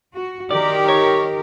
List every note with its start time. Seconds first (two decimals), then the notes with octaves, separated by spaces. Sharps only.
0.14 F#4
0.51 D#3 G4 A#4 D5
0.89 C#5